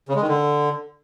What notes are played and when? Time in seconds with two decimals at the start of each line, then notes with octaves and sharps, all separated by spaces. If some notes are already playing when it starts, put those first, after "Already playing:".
0.09 C#3
0.15 G#3
0.22 D#3
0.28 D3